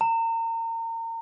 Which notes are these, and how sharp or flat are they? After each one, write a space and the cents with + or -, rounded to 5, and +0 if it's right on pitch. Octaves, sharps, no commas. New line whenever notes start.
A#5 -35